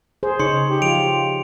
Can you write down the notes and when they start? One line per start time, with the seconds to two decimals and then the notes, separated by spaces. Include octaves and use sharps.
0.23 G#4 C5
0.40 C#3 D#4 C#5 C6 C#7
0.69 G4
0.82 F3 F4 D7 F7